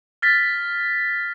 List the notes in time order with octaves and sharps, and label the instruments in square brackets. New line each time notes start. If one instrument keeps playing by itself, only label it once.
[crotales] F6 A6 B6